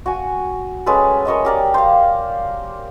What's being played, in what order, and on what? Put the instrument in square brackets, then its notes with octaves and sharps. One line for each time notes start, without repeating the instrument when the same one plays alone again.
[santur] F#4 G#5
G#3 C#4 A4 B4
A#4 C#5 D#5 E5
G4 A#4 D5
C5 F5